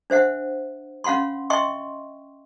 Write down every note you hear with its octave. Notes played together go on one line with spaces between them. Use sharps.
D4 C5 E5 F#5
C#4 F5 F#5 B5 C6
D#5 E5 G5 C6 C#6